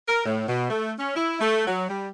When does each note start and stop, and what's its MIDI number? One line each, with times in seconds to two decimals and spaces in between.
0.08 0.23 70
0.26 0.47 45
0.48 0.68 47
0.70 0.92 57
0.99 1.14 61
1.15 1.37 64
1.41 1.64 57
1.67 1.89 54
1.89 2.09 55